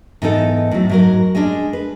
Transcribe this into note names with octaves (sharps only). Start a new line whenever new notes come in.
G#2 E3 B3 D#4 A4
A2 F#3
G#2 F#3 A#4
G#3 C#4 D4 G#4
B4